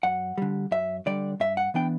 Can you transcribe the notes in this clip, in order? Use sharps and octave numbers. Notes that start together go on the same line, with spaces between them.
F#2 F#5
D3 G3
F#2 E5
D3 G3 D5
G2 E5
F#5
E3 B3 D4 G5